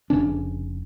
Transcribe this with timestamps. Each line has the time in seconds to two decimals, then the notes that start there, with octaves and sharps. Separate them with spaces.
0.10 F1 C#3 C#4 D4